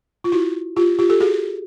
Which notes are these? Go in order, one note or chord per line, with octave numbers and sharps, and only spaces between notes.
F4
E4 F#4
F4 G4
F4 G4
G4 A4
F#4 G#4